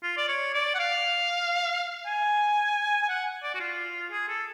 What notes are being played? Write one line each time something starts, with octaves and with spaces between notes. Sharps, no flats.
F4
D5
C#5
D5
F#5
F5
G#5
G#5
F#5
D5
F#4
F4
G#4
A4